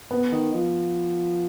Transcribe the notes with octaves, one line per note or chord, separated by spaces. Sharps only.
B3
D#3
F3